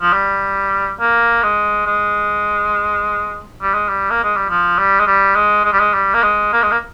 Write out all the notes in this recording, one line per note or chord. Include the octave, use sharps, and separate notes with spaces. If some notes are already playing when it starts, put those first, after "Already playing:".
F3
G3
A#3
G#3
G#3
G3
G#3
G3
A#3
G#3
G3
F3
G3
G#3
G3
G#3
G#3
G3
G#3
G3
A#3
G#3
A#3
G#3
A#3